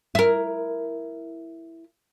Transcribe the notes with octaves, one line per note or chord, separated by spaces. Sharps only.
E4 A#4